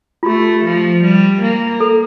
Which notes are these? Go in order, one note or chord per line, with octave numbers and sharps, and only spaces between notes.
F4
A3 G4
F3
G3
A#3
A4